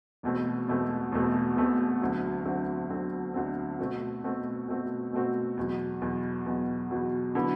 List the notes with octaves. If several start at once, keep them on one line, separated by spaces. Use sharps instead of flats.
E1 E2 B2 A3 C4
E1 E2 B2 A3 C4
E1 E2 B2 A3 C4
E1 E2 B2 A3 C4
D2 D3 F#3 C4
D2 D3 F#3 C4
D2 D3 F#3 C4
D2 D3 F#3 C4
B2 A3 C4 F#4
B2 A3 C4 F#4
B2 A3 C4 F#4
B2 A3 C4 F#4
E2 B2 F#3
E2 B2 F#3
E2 B2 F#3
E2 B2 F#3
D3 F#3 B3 E4